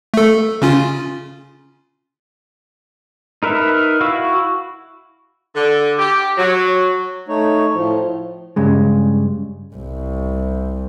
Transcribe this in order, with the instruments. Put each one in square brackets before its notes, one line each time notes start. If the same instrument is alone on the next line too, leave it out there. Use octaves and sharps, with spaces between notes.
[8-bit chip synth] A3 A4
C#3 C#4 F4
[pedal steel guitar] D#4 A#4 B4 E5
E4 F#4 F5 E6
[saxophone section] D3
G4
F#3
[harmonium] A3 D#4 C#5
A2 F3
[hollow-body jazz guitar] G2 C#3 G#3
[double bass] C2